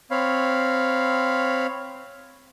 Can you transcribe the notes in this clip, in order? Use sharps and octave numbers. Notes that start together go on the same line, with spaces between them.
C4 C#5 F5 B5